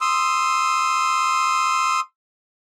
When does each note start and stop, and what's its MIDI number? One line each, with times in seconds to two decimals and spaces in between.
0.01 2.00 84
0.01 2.00 87
0.01 2.00 88